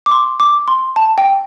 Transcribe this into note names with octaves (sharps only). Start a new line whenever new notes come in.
D6
C6
D6
C6
A5
G5